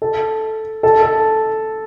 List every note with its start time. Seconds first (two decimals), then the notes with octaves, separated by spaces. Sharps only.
0.02 A4
0.83 A4
1.03 A4